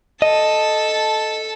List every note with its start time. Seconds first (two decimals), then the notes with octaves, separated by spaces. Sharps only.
0.22 A4 D#5 A5